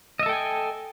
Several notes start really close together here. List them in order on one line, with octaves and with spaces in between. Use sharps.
D#5 E5 A4 G5 G#5